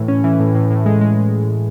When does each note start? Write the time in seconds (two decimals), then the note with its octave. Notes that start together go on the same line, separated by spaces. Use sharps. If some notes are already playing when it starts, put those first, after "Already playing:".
Already playing: A2 E3
0.08 C#4
0.24 E3
0.40 A2
0.55 A2
0.70 A2
0.86 G#3
1.01 G#3